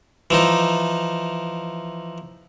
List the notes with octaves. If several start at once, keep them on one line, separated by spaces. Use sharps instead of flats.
E3 F3 D#4